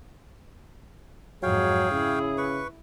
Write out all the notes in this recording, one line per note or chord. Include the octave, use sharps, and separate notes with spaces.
F2 G#2 F#3 G#4 C#5 F5 G5
C#3 E4
B4 C#6